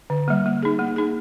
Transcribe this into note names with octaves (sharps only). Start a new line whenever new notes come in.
D3
G3 A#3
A#3
D#4 G#4
A#3
D#4 G#4